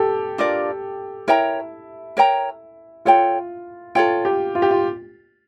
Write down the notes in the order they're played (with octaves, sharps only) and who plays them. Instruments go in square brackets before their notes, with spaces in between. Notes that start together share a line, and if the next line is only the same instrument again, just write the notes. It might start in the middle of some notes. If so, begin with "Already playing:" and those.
Already playing: [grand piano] G4 A4
[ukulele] D4 F4 A#4 D5
[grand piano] E4 [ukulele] A#4 C#5 G5 A#5
[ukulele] A#4 C#5 G5 A#5
[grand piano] F4 [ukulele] A4 C#5 G5
[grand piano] F4 [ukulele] A4 C#5 G5
[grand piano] G4
F4
G4
F4